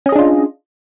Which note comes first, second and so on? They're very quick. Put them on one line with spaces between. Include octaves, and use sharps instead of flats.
C#4 D#5 G#4 D4 F4